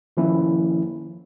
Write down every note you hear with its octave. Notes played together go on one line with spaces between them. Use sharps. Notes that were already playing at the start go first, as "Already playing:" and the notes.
D#3 F3 A#3 C#4 E4